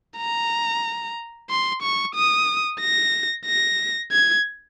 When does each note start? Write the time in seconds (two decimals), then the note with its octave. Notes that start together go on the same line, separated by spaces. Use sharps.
0.17 A#5
1.50 C6
1.82 C#6
2.15 D#6
2.81 A#6
3.46 A#6
4.12 G#6